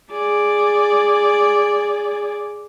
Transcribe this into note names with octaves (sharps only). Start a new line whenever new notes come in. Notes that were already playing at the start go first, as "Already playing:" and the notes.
G#4 D5